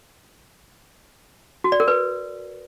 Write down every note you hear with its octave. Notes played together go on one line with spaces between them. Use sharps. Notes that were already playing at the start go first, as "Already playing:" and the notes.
F#4
D5
A#4
B4